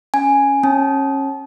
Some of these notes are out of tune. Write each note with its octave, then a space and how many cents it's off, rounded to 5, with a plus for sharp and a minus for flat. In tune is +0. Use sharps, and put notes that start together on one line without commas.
C#4 +0 G#5 +0
C#4 -30 A5 -30